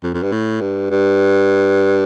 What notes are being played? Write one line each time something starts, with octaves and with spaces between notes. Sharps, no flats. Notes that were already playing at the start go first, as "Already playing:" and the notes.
F2
F2
G2
A2
G2
G2